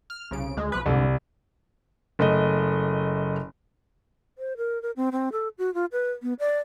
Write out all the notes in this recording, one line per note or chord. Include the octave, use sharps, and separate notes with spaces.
F6
C2 C#3 D7
D2 G#3
B1 F3 B4
C2 G#2 D3
F#1 A3 D#5
C5
A#4
A#4
C4
C4
A4
F#4
F4
B4
B3
D5